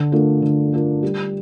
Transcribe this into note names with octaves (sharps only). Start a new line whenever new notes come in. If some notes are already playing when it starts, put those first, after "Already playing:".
Already playing: D3
A3 D4 F4 A#4
D3
A3 D4 F4 A#4
G3